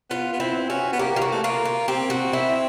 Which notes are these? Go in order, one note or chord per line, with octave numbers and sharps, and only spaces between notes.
B3 F4
B3
C4 E4
C#4 F#4
B3
A#3 G4
F4
F#4
A3
A#3 F4
F4
C4 G4
F#4
E4